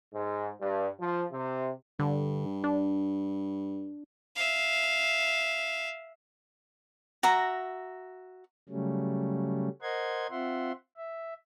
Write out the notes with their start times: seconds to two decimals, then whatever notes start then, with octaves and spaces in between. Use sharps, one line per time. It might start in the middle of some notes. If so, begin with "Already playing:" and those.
0.13 G#2
0.60 G2
0.99 F3
1.32 C3
1.99 G2 D3
2.64 D4
4.36 E5 F5
7.23 F#4 E5 A#5
8.69 C#3 F#3 G3 A3 C#4
9.82 A#4 C5 D#5 F#5 C6 G#6
10.30 C4 F4 E5 F#5 C6
10.97 E5